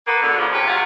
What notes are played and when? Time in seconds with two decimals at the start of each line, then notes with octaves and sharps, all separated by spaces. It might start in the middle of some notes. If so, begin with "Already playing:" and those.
0.07 A#3 B3
0.21 G#2 B2 D3
0.38 A#2 C#3 F3
0.52 F2 C3 C#4 G4 B4
0.67 G#2 C3 A3 F4 F#4